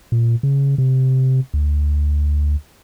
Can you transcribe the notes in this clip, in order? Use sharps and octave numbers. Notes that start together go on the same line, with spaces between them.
A#2
C#3
C3
D2